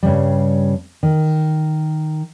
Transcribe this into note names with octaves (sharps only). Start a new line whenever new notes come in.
G2 C#3 G3
D#3